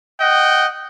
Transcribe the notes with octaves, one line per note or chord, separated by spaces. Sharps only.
D#5 F#5 G5